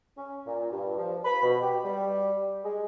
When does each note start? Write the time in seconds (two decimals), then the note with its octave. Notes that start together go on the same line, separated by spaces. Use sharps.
0.17 C#4
0.47 A#2
0.72 G2
0.98 F3
1.25 B5
1.42 B2
1.61 G4
1.84 G3
2.64 G#3